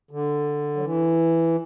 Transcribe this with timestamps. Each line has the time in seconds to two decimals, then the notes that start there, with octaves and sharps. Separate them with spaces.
0.11 D3
0.76 F#3
0.82 E3